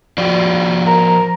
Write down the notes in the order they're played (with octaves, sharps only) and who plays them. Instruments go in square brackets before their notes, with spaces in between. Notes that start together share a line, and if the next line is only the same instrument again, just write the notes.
[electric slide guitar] F3 F#4 D5
[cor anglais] A#4